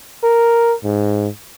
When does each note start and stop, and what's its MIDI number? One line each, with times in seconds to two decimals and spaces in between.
0.24 0.73 70
0.84 1.27 44